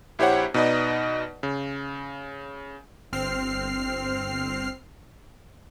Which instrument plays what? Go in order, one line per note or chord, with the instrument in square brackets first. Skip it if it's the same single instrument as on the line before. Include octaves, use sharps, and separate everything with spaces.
[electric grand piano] A#1 E4 G4 C5 C#5 F#5
B2 D#4 B4 D5 D#5
C#3
[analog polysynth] G1 C4 F6 C7